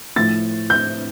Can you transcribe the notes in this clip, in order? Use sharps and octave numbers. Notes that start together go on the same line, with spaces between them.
A2 F3 A6
G6